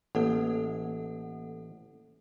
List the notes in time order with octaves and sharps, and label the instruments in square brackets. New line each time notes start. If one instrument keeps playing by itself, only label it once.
[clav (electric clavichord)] A1 [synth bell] A#3 A4 F#5